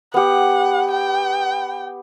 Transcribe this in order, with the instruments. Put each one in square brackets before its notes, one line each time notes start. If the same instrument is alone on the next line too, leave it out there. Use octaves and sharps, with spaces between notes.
[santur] B3 G4 [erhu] F#5
[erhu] G5